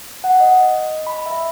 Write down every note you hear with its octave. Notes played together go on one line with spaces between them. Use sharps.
F#5
D#5
B5
E5